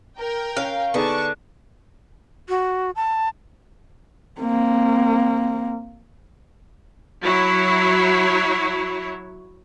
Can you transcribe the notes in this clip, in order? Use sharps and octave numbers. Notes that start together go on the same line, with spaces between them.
A#4 G5
C#4 F5
D3 B3 D#4 G#4 D5 A5 C#6
F#4
A5
A#3 C4
F#3 E4 C#5